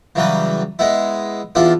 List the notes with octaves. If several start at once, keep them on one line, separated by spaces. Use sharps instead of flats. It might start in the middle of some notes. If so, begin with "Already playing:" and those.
C#3 E3 F#3 G3 B4
G#3 B3 E4
E2 B3 D4 E4 F4